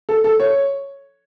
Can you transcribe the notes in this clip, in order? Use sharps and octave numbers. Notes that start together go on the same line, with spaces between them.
A4
A4
C#5